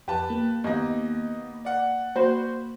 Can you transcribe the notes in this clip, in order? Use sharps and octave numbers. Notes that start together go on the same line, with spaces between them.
F2 G4 B4 A5
A#3
D#2 B3 D#5
D5 F#5
A#3 F#4 C5 B5